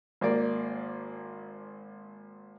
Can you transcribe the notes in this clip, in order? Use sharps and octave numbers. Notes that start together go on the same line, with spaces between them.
G#1 A#3 D5 D6